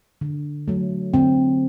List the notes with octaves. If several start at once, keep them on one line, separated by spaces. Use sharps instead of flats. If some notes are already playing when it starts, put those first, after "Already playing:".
D3
F#3 A3
D3 C4